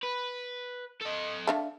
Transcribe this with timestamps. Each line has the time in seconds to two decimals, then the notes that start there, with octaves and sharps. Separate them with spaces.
0.03 B4
1.01 A4 D#5
1.47 A3 D4 F5